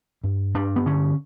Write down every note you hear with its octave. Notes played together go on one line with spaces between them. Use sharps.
G2
G2 D4
B3
D3 C#4